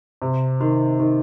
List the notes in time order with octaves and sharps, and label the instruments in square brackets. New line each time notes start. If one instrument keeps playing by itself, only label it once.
[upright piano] C3
D#3
D#3